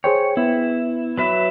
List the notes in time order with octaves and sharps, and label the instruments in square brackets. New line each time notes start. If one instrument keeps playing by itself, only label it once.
[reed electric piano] G#4 C5 G5 [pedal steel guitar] C#5
[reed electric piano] B3 [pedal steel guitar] E4
[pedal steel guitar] F#3 B4 E5